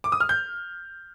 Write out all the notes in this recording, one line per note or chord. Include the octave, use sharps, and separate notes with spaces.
D6
D#6
F6
G6